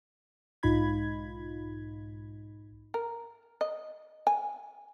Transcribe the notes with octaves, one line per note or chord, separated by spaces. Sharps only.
B1 G#2 D#4 F4 B5 G#6
A#4
D#5
G#5